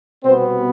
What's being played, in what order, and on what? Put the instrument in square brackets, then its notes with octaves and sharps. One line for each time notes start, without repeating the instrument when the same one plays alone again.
[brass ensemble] C2 B2 B3 C4 C5